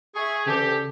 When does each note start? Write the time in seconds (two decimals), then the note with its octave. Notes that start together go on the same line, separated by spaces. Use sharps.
0.15 G#4 E5 C#6
0.46 D2 C#3 E3 G4 A4